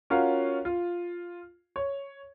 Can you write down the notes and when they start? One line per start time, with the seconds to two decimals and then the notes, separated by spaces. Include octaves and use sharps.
0.10 C#4 F4 F#4 A#4 F5
0.65 F4
1.76 C#5